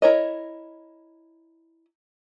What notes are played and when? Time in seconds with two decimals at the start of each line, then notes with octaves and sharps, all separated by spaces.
0.02 E4 A#4 C#5 D#5